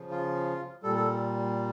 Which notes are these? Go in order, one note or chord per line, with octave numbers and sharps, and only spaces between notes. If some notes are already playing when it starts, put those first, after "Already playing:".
Already playing: C#3 F3
F4
A#2 G3 A4
A4